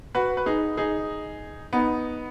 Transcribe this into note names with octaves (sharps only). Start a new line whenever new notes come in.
F#4 B4
B4
D#4 G#4
D#4 G#4
B3 D#4